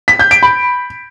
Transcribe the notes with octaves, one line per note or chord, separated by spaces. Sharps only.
B6
G6
D7
B5